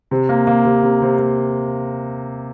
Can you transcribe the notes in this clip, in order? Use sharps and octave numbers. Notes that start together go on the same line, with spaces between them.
C3
A#3
A#3
C3
C3
C3
A#3